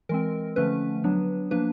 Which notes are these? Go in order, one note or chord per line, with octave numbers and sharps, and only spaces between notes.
E3 G#3 C4 A#4
D3 F3 A3 C#4 B4
F#3 B3 D4
F3 A#3 D4 B4